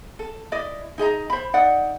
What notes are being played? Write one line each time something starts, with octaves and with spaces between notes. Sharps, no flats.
A4
E4 D5 D#5
D#4 G#4 D#5 A#5
C5 B5
D#4 D5 F#5